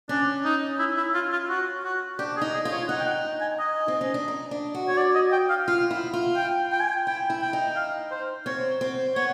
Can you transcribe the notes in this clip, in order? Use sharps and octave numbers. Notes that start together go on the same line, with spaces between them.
C#4 D4
D#4
E4
E4
F4
F4
F#4
F#4
D4 G4
G#4
D#4
G#4
F4
C#5
D#4 F#5
G5
F#5
G#5
D#5
C4
C#4
D4
D#4
D4
F#4
C#5
D5
D#5
G5
F5
F4 F5
E4
F4
G5
G5
G#5
G5
E4 G5
E4
G5
D#4
F5
C5
C4 C#5
C4
B3 C#5